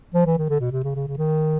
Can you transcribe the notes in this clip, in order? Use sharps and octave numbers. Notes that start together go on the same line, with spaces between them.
F3
E3
D#3
D3
B2
C3
C#3
C#3
C#3
D#3